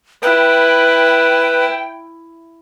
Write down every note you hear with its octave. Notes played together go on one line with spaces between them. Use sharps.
E4 B4 G5